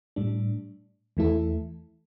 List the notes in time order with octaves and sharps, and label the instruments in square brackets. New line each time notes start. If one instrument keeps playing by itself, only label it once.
[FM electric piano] A2 G3 D4
E2 E3 A3 E4 A4